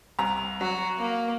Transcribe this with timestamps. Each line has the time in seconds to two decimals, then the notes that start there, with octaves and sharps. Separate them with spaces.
0.19 C2 A#5
0.61 F#3 F#4
0.98 A#3